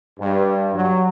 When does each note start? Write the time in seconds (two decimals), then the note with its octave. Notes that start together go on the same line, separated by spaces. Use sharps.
0.19 G2
0.74 F#3